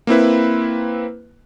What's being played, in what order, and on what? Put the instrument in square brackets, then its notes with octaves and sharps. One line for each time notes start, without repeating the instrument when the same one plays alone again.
[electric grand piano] A#3 C4 E4 B4